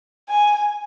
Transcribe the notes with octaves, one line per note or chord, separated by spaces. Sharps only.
G#5